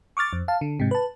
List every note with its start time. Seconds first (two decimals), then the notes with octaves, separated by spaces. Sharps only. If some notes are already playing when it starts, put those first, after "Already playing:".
0.17 C#6 D6 F6 A6
0.33 F2
0.48 F5 A5
0.61 D3
0.80 G#2 C3
0.91 B4 A5